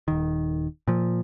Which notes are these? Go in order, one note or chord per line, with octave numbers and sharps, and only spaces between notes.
D#1 D#3
A#2 F3